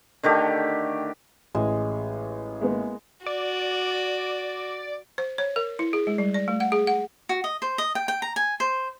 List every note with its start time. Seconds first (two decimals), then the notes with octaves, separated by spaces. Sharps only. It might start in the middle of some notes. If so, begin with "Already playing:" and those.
0.23 D3 D#3 A3 G4
1.55 A1 G#3
2.61 G#3 A#3 B3
3.26 F#4 D5
5.18 C5
5.38 C#5
5.56 A#4
5.79 E4
5.93 G#4
6.07 G#3
6.18 G3
6.34 D5
6.48 A3
6.60 F#5
6.72 G#4
6.87 F#5
7.29 F#4
7.44 D#5
7.62 C5
7.78 D#5
7.95 G5
8.08 G5
8.22 A#5
8.36 G#5
8.60 C5